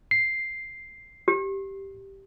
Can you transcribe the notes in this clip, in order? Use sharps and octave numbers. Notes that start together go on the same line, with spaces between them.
C7
G4